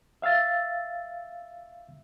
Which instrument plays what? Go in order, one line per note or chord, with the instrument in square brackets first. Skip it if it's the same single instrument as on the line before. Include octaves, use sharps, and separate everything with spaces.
[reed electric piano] E5 F5 E6 A6